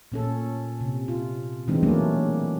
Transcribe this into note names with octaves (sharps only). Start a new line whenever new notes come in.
A#2 C#4 A4
C3
F4
B2 E3 G#3 C4 D4 D#4
F#3 G3 A3 A#3 C#4 D4